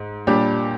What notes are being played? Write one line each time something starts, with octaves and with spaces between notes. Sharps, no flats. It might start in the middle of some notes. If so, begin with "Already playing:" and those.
Already playing: G#2
A#2 G3 D4 G4